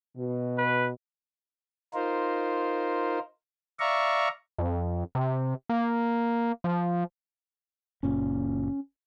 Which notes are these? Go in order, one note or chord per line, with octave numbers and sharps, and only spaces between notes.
B2
B4
D#4 F4 A#4 C5
D5 E5 F5 A#5 C#6
F2
C3
A#3
F3
F#1 A#2 C#4